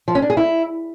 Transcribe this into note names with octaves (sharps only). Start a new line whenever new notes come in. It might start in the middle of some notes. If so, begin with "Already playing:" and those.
F3
C#4
D4
G#4
E4